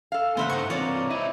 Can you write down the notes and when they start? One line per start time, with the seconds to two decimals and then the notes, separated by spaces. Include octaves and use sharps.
0.12 A4 F5
0.37 A#2 C#3 E3 A3 C5 E5 F#5
0.50 G2 D#4 C5 F#5 C#6
0.70 C3 E3 F4 C#5 D5 A#5
1.10 C4 D#4 E4